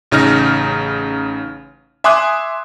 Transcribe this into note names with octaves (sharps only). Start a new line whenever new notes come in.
A1 C#3 D#4 F6 A#6
E5 G#5 C6 D6 D#6 F#6